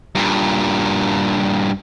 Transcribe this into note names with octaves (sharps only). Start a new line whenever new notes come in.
G2 A#2